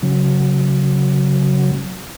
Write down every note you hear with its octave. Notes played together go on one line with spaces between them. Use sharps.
C#3 F#3